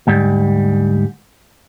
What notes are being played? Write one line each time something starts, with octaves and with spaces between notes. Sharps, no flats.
D2 G#2 G3